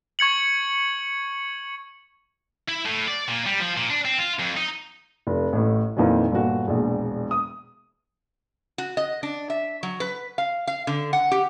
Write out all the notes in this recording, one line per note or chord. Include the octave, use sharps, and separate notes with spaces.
C#6 G#6 C#7 F#7
E4
A2
D5
A#2
G3
F3
A#2
D4
C4
F4
F2
D#4
F1
A1 A2
F2 A#2 D#3 E3 F#3
G1 A#2 F#4
E1 A#1
D#6
F#4
D#5
D4
E5
F#3
B4
F5
F5
D3
F#5
G4